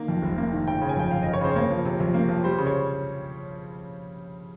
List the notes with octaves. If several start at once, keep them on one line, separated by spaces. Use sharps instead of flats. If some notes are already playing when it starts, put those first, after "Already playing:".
Already playing: D#3 A#3
F2
F1
A#3
D#3
G1 G5
C#3
G#5
F2 G5
G1 F5
G1 D#5
C#5
C#3 C5
A#3 C#5
F3
C3
F2
A#3
F3
G3 C5
C#3
C#5